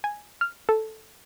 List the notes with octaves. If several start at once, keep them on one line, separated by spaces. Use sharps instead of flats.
G#5
F6
A4